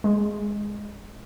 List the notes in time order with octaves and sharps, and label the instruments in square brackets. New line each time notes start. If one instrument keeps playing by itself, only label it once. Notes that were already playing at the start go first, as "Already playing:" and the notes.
[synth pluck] G#3